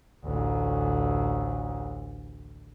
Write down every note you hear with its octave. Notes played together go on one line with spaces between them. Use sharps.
A1 D2